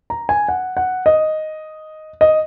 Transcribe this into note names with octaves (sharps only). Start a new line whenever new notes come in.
A#5
G#5
F#5
F#5
D#5
D#5